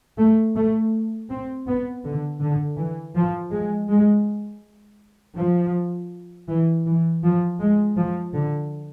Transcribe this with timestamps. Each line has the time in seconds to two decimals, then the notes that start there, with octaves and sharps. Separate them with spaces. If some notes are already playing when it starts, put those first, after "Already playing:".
0.19 A3
0.56 A3
1.30 C4
1.67 B3
2.04 D3
2.41 D3
2.78 E3
3.15 F3
3.52 G#3
3.89 G#3
5.37 F3
6.49 E3
6.85 E3
7.23 F3
7.59 G#3
7.96 F3
8.34 D3